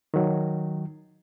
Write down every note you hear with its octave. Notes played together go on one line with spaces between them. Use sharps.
D#3 F#3